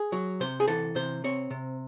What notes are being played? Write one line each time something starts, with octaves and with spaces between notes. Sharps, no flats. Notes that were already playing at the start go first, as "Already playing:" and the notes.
Already playing: G#4
F#3
C3 C5
G#4
E3 A4
C3 C5
C4 C#5
C3